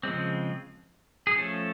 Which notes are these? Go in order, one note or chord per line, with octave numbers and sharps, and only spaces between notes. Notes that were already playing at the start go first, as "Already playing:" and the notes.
C#3 F3 G#3 C4
G#4
F3 A3 C#4 A4